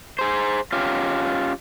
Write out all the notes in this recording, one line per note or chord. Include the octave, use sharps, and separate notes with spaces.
G#4 C5
C#4 F4 G4